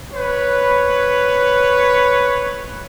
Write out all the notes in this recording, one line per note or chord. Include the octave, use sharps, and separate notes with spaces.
B4 C#5